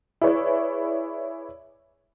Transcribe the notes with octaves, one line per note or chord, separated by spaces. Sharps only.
E4 G#4 B4 C#5 D5